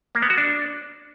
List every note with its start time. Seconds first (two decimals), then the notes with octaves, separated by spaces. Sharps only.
0.15 A#3
0.22 B3
0.30 F#4
0.38 D4